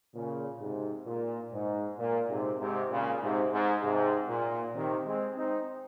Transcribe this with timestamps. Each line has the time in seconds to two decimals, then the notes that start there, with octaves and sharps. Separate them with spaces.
0.14 A#2 C#3
0.60 G#2 C3
1.07 A#2
1.53 G#2
1.99 A#2
2.30 G#2 C3
2.60 G#2 C3
2.91 A#2 C#3
3.22 G#2 C3
3.52 G#2
3.83 G#2 C3
4.29 A#2
4.75 C3 D#3
5.06 G#3 C4
5.37 C4 D#4